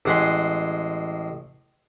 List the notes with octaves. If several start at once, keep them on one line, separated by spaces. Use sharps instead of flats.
A1 G#3 F#5 G#5 B5 C6